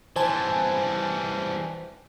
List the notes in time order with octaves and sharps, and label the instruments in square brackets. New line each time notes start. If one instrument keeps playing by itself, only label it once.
[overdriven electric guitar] E3 G3 [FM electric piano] C5 G#5 A5